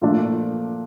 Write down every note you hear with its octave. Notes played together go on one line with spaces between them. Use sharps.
A#2 F3 A3 D4